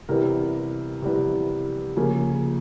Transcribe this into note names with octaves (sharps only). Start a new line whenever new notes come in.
C3 E3 G3 B3 A#4
C3 E3 G3 B3
C#3 F3 A#3